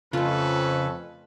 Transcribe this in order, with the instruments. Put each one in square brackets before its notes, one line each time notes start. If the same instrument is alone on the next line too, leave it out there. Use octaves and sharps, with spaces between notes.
[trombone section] F2 [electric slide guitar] C#3 [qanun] A3 F4 [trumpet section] C#4 A4 B4